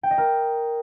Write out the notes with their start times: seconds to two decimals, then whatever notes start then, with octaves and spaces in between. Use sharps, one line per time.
0.03 G5
0.11 D#5
0.18 A#4